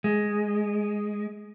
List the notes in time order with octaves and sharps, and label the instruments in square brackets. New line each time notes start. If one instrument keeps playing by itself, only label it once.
[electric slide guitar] G#3